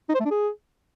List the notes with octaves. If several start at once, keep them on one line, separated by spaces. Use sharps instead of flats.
D#4
C5
A3
D4
G#4